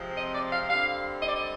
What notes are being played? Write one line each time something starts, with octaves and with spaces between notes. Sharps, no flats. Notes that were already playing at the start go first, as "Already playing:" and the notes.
Already playing: C3 F3 G#3 C4
D#5
D5
F5
D3 G3 C4 F5
D#5
D5
D#5